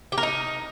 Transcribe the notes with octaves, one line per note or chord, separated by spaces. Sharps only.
G4
A#4
D#4